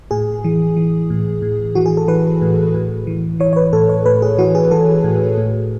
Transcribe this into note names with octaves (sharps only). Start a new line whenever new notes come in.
A2 G#4
E3
E3
A2
A2
E3 F#4
G#4
A4
E3 B4
A2
A2
E3
E3 C#5
C#5
B4
A2 A4
C#5
A2 B4
G#4
E3 F#4
G#4
E3 A4
A2
A2